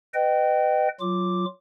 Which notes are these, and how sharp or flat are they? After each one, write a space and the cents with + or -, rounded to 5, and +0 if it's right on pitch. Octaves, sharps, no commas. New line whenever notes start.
B4 +20 D#5 -25 G5 -20
F#3 +0 F4 +0 D6 +0